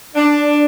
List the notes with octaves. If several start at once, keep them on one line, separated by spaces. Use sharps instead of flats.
D4